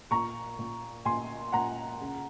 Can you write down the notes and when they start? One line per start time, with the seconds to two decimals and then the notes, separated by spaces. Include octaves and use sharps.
0.11 A#2 A#5 C#6
0.59 A#2
1.05 A#2 G#5 C6
1.52 A#2 F#5 A#5
2.00 C#3